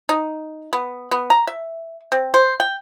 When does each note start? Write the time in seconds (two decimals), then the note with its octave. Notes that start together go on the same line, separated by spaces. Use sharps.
0.09 D#4
0.73 B3
1.11 B3
1.30 A#5
1.47 E5
2.12 C4
2.34 C5
2.60 G5